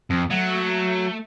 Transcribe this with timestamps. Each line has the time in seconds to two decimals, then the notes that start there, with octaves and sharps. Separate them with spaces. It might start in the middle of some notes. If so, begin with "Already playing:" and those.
0.10 F2
0.30 F#3 A3